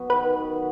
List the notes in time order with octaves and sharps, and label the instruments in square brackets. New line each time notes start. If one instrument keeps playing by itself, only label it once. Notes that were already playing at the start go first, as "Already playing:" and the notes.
Already playing: [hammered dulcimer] F#3 B3
[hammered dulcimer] D#3 [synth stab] B4
[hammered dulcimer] F#3 B3